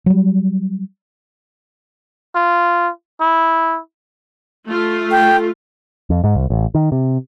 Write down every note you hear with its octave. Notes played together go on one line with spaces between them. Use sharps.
F#3 G3
F4
E4
A3 F4
G5
F2
G#2
C2
A1
D#3
C3